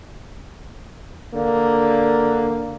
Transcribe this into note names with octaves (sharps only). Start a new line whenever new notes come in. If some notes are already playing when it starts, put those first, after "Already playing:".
D3 A#3